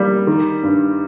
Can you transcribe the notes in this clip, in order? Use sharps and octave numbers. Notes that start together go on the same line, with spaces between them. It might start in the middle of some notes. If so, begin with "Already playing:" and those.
Already playing: G3 A#3
D#3
G2